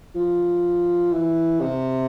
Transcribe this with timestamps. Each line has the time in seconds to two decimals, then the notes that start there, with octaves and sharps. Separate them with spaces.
0.15 F3
1.12 E3
1.60 C3